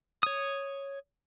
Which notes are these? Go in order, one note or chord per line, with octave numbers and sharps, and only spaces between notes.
C#5 D#6